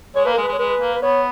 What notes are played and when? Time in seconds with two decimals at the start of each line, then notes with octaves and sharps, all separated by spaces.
0.16 G#3 C#5
0.25 A#3 B4
0.34 G#3 A#4
0.42 B4
0.48 G#3
0.53 C#5
0.59 G#3 B4
0.81 A#3
0.95 B4
1.02 B3 C#5